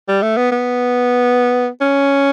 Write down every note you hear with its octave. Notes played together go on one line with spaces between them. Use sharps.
G3
A3
B3
B3
C#4